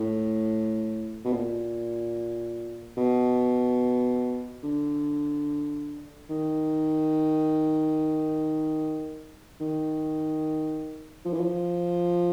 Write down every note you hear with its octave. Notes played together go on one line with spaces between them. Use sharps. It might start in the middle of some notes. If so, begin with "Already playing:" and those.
Already playing: A2
B2
A#2
B2
D3
D#3
D#3
F3
E3
F3